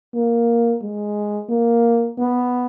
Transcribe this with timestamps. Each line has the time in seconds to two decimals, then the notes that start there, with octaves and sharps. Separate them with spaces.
0.14 A#3
0.82 G#3
1.49 A#3
2.18 B3